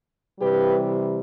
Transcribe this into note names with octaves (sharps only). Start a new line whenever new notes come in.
C3 E3 G3 G4 B4